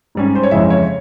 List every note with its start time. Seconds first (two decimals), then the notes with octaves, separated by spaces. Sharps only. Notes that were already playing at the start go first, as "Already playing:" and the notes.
0.15 G#2 G3 C#4
0.35 C5
0.43 C#5
0.51 F2 C#3 E3 G#3 E5
0.70 C#5